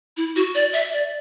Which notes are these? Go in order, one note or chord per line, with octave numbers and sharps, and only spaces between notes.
E4
F#4
D5
E5
D5